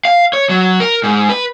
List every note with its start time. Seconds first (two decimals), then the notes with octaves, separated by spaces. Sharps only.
0.05 F5
0.33 C#5
0.49 F#3
0.80 A#4
1.04 G#2
1.29 B4